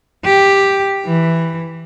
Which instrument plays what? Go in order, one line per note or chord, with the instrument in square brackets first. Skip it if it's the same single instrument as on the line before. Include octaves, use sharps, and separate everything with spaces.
[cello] G4
E3